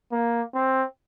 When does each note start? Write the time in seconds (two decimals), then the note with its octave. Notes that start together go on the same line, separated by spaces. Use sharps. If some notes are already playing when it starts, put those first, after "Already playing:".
0.12 A#3
0.55 C4